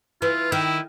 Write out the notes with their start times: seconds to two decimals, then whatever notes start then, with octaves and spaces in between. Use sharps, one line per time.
0.22 E3 F4
0.52 D#3 E4